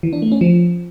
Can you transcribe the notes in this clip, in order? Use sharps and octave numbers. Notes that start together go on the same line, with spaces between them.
E3
D4
A3
C#4
F3